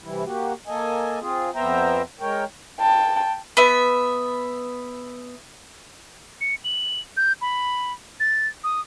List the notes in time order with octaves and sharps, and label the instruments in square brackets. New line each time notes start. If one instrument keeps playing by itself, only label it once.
[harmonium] G2 C3 E3 G3 E4
A#3 F#4 G4
A#3 A4 D#5 G#5
C4 F4 G#4
F2 B3 C5 E5 G5 A#5
G#3 A#4 C#5 G5
[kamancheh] G5 A5
[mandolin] B3 E5
[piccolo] C#7
F#7
G6
B5
A6
D#6